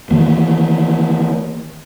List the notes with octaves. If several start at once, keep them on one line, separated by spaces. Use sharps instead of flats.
D#3 E3 A#3